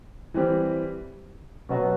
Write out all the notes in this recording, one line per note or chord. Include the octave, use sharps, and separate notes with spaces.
E3 G3 C4 G4
B2 F#3 B3 F#4